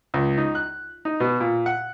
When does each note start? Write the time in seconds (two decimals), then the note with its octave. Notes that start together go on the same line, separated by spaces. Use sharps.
0.14 C#2
0.38 D#4
0.55 F#6
1.05 D#4
1.20 B2
1.40 A#2
1.66 F#5